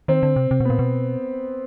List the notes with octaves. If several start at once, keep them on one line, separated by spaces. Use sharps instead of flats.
D#3 C4
D3
C3
C3
B2
A#2 B3
B2